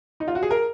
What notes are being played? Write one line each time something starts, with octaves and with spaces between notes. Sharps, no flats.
D#4
F4
F#4
G#4
A#4